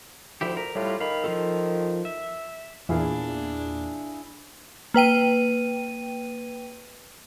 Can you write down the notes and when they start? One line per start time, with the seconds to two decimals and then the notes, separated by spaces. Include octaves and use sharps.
0.41 D2 F3 E4 G4
0.57 A#4
0.75 A2 G3 F4
1.00 D#3 F5 B5
1.24 F3 F4 A4
2.05 E5
2.89 E2 A#2 D4 E4 G#4 F5
4.94 A#3 B4 G5 D#7